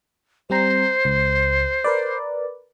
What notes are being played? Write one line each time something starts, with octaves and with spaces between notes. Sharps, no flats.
G3 C4 C5 A#5
C#2
A#4 B4 D5